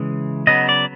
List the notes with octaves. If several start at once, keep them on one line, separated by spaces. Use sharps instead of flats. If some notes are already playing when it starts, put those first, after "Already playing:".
Already playing: C#3 E3 G#3
C#3 F#3 B3 D#5
D5